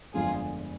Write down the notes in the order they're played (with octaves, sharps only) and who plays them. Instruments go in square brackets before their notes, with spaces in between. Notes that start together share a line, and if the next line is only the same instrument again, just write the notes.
[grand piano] G1 F2 D3 G#3 [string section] F4 G#4